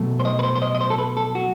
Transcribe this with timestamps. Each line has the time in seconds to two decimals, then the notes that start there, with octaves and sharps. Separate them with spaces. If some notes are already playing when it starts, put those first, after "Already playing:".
Already playing: B2 F#3 A3
0.20 C5
0.25 D#5
0.39 B4
0.43 C5
0.55 C5
0.62 D#5
0.75 D#5
0.80 C5
0.90 A4
0.98 B4
1.17 A4
1.35 F#4